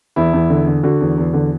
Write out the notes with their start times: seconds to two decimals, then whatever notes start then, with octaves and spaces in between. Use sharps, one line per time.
0.16 E2 E4
0.33 E2
0.50 D3
0.67 D3
0.83 D3 F#4
1.01 E2
1.18 E2
1.33 D3